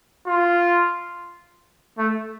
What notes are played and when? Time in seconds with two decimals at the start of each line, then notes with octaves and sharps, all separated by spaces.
0.27 F4
1.99 A3